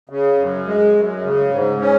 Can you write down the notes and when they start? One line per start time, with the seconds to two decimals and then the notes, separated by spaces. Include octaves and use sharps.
0.09 C#3
0.38 F#2
0.67 G#3
0.95 F#2
1.23 C#3
1.52 G#2
1.80 C#4